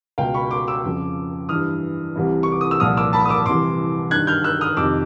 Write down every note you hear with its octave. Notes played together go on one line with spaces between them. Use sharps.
C#2 B2 F5 G5
B5 C#6
C6 D6
D6 E6
F2 C#3 F3
G2 E3 D#6 F6
C2 C3 E3
C#6
D6
D#6
E6
C2 A#2 F3 D#6 F6
D6 E6
A5 B5
D#6
D6 E6
C2 C3 E3 C6 D6
G2 F#6 G#6
D#3
F6 G6
E6 F#6
D#6 F6
F2 C3 D#3 D6 E6